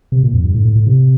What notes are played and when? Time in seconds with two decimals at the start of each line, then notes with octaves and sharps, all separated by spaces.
0.12 C3
0.23 A#2
0.33 F2
0.44 G2
0.54 A2
0.65 A2
0.76 A2
0.87 C3